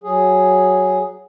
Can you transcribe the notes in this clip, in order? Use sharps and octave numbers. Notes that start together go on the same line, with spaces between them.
F#3 G#4